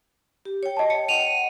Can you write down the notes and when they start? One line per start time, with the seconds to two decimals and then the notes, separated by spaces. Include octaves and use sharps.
0.45 G4
0.63 C#5 G5
0.77 D#5 A5
0.90 C#7
1.08 D#5 F#5 D#7 F7